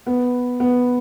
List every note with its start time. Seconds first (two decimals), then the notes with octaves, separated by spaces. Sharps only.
0.07 B3
0.60 B3